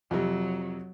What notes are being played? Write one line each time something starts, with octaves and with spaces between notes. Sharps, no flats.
F2 C3 F#3